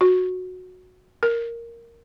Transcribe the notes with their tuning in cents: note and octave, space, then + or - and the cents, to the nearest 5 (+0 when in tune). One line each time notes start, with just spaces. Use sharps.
F#4 -15
A#4 -5